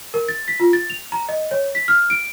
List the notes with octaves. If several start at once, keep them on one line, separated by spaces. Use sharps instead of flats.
A#4
A6
B6
F4
A6
F7
A#5
D#5
C#5
B6
F6
D7